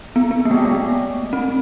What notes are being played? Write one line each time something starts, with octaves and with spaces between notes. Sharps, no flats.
B3
B3
A#3
G#3
A3
G#3
A3
C4